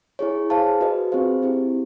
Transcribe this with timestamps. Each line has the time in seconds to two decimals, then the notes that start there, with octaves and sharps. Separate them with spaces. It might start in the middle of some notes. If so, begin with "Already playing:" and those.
0.19 E4 G#4 C#5
0.50 G#4 C5 F5 A5
0.81 F#4 B4 D#5
1.12 C4 F4 G#4 C5 F5
1.42 C4 E4 G4